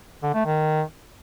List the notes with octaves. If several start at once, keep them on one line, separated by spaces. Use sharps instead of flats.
D3
A3
D#3